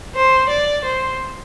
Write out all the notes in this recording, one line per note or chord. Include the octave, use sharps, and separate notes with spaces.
C5
D5
C5